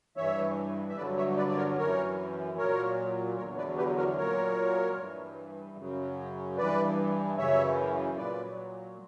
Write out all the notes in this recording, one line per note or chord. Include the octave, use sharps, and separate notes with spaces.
G2 E3 C#5 E5
E5
G2 D3 F#3 B4 D5
C#5 E5
B4 D5
D5
A#4 C#5
F#2 E3 A#4 C#5
A#2 F#3 A#4 C#5
E2 D3 F#3 A#4 C#5
B4 D5
G4 B4
F#4 A#4
A#2 F#3 A#4 C#5
G2 E3
F#2 C#3 F#3
G2 E3 B4 D5
F#2 C#3 E3 C#5 E5
A#2 F#3 B4 D5